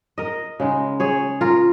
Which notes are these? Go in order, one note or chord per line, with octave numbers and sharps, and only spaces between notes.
A#4 D#5
C#3 G#3 D#4
G#4 C#5
F4 A#4